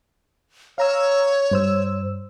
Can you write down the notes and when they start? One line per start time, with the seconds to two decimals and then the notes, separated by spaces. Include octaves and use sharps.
0.78 C#5 F5 A#5 E6
1.51 G2 C5 E6